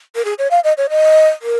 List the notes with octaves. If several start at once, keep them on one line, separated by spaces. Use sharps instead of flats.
A#4
G#4
C#5
F5
D#5
C#5
D#5
A#4